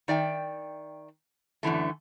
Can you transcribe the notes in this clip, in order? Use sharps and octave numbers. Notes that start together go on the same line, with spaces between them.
D#3 D5 E5 G5
F#2 D3 E3 A3